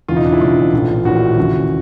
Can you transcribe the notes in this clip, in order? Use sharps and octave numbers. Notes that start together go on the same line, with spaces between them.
E1 E2 C#3 E3 F4
D#4
D4
E4
E1 E2 C#3 E3 F4
A#1 A2 E3
A#1 A2 E3 F#4
D#2 C#3 E3